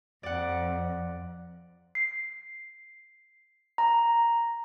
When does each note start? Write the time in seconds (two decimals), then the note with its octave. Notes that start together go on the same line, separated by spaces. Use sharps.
0.23 F2 D5 F#5
1.95 C7
3.78 A#5